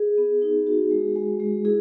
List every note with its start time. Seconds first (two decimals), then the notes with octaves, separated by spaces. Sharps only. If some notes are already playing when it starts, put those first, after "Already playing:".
Already playing: G#4
0.18 B3
0.42 D#4
0.67 F#4
0.91 G#3
1.16 G#3
1.40 G#3
1.65 E4 G#4